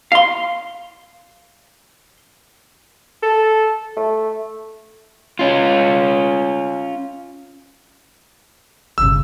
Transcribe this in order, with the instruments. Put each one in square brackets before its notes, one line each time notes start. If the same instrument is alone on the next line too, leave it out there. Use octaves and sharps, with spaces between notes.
[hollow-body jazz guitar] F5 C6
[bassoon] A4
A3
[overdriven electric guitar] C#4 F4
[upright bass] G1 C#3 [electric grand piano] E6